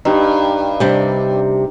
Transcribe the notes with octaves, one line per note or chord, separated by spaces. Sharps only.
G2 D#4 G4
C3 G3 D4